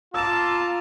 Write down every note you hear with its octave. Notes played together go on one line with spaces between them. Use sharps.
F4 A5 A#5 D6 E6 E7